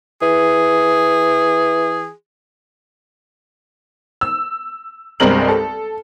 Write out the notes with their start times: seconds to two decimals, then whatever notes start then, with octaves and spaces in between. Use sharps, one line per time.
0.22 E3 G#4
4.21 E6
5.20 C2 G2 G#3 C4 A#4 F#7
5.48 A4